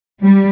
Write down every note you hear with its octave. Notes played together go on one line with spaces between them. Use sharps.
G3